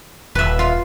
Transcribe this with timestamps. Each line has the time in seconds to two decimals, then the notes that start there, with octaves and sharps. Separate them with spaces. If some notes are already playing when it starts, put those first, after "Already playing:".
0.35 D#1 B4 E5
0.59 F4